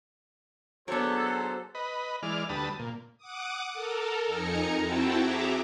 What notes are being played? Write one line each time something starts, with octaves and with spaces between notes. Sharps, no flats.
F#3 B3 D4 G#4 A4 C5 C#5
B4 D#5
E3 G#3 D5 F6
D2 G3 B4 A5 D#6
A#2
F#5 D6 D#6
A4 A#4
F2 D#4 G#5 A#5 C#7
C4 E4 F#4 G5 A5
F#4 G#4 E5 A#5 D6